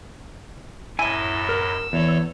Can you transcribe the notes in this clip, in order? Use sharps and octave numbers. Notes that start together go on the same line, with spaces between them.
F#2 A2 E4 D#5 G#5 E6
A#4
E2 A4 C#5